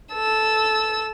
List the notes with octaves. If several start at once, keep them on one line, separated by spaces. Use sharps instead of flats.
A4 E6